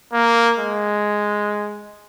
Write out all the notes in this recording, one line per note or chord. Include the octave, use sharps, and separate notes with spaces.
A#3
G#3